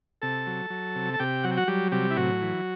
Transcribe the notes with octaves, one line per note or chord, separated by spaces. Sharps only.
C3 A4 A5
F#3
F#3
C3
A5
C3 G4 G5
F#3 F#5
G5
F#4 F#5
F#3 G3 G4
C3 G3 G4
E4
A2 F#3 F#4
E3